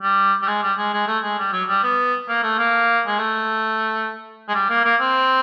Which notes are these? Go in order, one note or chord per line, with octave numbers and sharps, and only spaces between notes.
G3
G3
G#3
G3
G#3
G#3
A3
G#3
G3
F#3
G3
B3
A#3
A3
A#3
G#3
A3
G#3
G3
A#3
A#3
C4